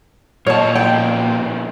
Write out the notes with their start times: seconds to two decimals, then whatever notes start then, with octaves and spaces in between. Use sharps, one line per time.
0.47 A#2 F4 C#5 D#5 A5
0.75 D2 F3 G5